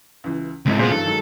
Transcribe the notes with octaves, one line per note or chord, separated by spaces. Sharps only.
C#2 E3
C#2 G#2 C4 E4
A#2 G#3 B3 G#4 C5
G2 E3 F#3 A4
D#3 F#3 G#3